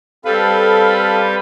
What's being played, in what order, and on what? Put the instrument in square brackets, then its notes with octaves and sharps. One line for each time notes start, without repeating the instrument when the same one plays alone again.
[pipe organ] G3 B4 [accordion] C4 A4 F5